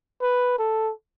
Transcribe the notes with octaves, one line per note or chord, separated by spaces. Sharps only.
B4
A4